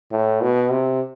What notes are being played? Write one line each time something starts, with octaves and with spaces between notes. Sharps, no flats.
A2
B2
C3